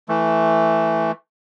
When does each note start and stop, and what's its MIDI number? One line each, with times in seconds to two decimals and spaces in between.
0.09 1.12 52
0.09 1.12 57